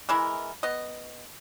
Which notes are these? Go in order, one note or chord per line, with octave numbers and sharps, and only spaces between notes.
E3 G#3 E4 A#4
B3 D#5